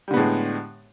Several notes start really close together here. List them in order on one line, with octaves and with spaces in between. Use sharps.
G3 D3 B3 A2 G#3